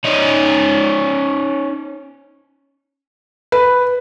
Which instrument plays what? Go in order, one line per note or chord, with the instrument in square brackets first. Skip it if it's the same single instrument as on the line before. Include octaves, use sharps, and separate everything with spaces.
[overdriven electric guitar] C#4 D#4
[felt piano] B4